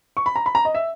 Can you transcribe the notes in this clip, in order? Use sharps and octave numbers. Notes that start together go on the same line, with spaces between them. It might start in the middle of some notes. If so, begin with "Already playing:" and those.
C#6
B5
A#5
B5
A#5
D#5
E5